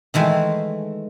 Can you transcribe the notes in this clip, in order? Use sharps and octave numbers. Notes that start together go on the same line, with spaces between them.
D#3 E3 G#3 A3